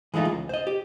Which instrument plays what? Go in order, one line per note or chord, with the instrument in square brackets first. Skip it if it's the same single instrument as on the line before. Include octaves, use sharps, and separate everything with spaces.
[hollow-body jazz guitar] E3 G#3 A3 D#4 F4
C#2
C5 D#5
G4